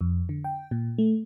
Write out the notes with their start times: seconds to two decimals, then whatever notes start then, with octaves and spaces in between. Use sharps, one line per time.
0.01 F2
0.29 D3
0.44 G5
0.71 A#2
0.98 A3